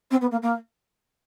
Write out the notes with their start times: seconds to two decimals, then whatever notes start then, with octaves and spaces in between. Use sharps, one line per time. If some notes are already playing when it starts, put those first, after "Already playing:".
0.11 C4
0.21 B3
0.31 A#3
0.42 A#3